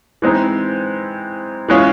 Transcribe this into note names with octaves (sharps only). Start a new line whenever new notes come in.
E3 G#3 C4 D#4
E3 G#3 C#4 F4 G#4